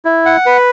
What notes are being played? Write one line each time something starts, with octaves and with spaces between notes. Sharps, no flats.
E4
F#5
B4